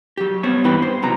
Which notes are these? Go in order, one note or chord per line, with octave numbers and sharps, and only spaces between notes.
F#3 G4
G3 B3 C4 C5 C#5
G2 E3 E4 B4 G5 B5
C5
B1 C3 F#3 A#5